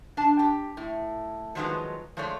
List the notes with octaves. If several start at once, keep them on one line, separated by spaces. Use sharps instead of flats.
D4 A5
G4
A2
D#3 F3 F#3 G#3 D#4 B4
F3 G#3 A3 C#5 D5